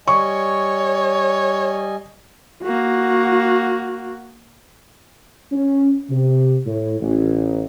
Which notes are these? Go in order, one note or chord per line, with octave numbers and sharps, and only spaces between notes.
G3 C#5 D#5 G#5 C#6
A#3 F#4
C#4
C3
A2
A1